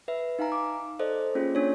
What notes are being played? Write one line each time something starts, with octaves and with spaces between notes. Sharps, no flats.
B4 E5
D#4 F5 G#5 A#5
D6
A4 C5 D5 D#5
A#3 C#4 F4 G#4
A#3 D4 C#5